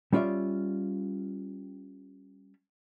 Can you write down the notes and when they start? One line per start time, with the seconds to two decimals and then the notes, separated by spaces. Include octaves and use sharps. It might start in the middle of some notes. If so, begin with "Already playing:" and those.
0.13 G3 C#4 F4 D5 E5